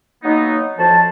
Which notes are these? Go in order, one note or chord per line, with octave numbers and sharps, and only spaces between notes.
F#3 A#3 B3 D#4
F2 A2 F3 F#4 C5 A5